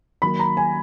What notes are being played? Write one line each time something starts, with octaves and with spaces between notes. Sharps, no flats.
D#3 F#3 A#3 B5
A#5
G#5